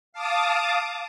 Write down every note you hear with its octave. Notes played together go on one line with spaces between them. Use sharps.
F5 A5 D6 D#6